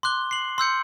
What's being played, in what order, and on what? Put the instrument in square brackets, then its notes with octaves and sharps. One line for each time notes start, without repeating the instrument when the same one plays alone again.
[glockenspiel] C6 D6 F#6 G7
C7 F#7
C6 E6 G6 C#7